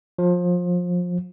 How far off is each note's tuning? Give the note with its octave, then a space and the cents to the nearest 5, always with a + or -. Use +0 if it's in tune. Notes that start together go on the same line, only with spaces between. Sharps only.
F3 +25